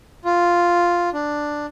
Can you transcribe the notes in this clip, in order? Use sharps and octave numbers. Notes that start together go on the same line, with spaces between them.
F4
D4